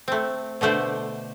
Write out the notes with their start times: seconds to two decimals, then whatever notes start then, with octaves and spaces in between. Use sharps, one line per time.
0.08 A3 C4
0.61 B2 D3 A3 C5 D5